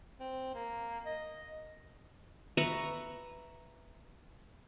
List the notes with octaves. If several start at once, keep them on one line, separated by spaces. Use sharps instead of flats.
C4
A#3
D#5
B4 E5 A#5 C#6